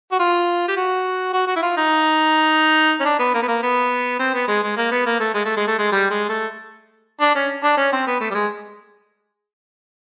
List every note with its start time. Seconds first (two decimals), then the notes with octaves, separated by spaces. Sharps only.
0.12 F#4
0.19 F4
0.68 G4
0.77 F#4
1.33 F#4
1.48 F#4
1.56 E4
1.63 F4
1.77 D#4
3.00 C#4
3.05 D4
3.19 B3
3.34 A#3
3.43 B3
3.48 A#3
3.63 B3
4.20 C4
4.34 B3
4.48 G#3
4.63 G#3
4.77 A#3
4.92 B3
5.06 A#3
5.20 A3
5.34 G#3
5.46 A3
5.57 G#3
5.68 A3
5.79 G#3
5.92 G3
6.10 G#3
6.29 A3
7.21 D4
7.35 C#4
7.64 D4
7.77 C#4
7.92 C4
8.07 B3
8.21 A3
8.31 G3
8.35 G#3